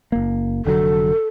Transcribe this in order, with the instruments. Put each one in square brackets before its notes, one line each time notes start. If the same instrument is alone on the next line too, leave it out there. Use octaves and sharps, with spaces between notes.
[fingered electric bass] F#1 A#3
[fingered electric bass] F1 D3 F#3 [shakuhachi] A4